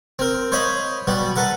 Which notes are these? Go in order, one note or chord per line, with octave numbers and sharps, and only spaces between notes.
C4 A#4
C5 C#5 D#5 F5 B5
B2 G3 F#4
A4 B4 F#5 A#5